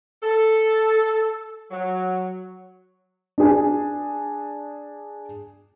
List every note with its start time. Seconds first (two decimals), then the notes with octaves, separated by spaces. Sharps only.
0.23 A4
1.71 F#3
3.38 D4 G#4